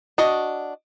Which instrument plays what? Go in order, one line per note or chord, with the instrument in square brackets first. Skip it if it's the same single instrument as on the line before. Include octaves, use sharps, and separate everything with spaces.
[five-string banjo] D4 F#4 D#5